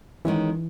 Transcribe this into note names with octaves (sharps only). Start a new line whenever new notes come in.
D#3 E3 G#3 C#4